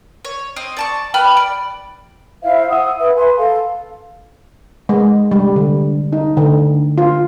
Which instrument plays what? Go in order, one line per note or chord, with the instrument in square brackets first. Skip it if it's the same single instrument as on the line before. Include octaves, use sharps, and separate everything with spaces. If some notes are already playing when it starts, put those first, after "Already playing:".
[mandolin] C#5
C4 D#5
D5 A5 C#6
B4 G5 B5 F6
D5
[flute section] E4 C5 E5 F5
F#5 D#6 E6
B4 E5
B4 G#5 C6
A4 F5
[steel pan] G#3
G3
D3
D#4
D3
F4